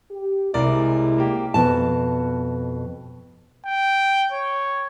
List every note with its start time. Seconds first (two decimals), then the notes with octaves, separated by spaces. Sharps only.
0.11 G4
0.54 C2 C3 G#3 E4 A#4 D5
1.18 A#3 G4
1.54 F2 B2 A5
3.65 G5
4.32 C#5